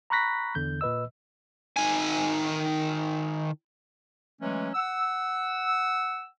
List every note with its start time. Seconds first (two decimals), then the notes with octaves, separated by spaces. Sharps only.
0.10 A#5 B5 C#6 F#6 A#6 B6
0.55 E2 D3 G6
0.81 A#2 B4 D#5 E6
1.76 D#3 G#5
4.40 E3 F#3 G#3 A3 C#4
4.74 F#5 E6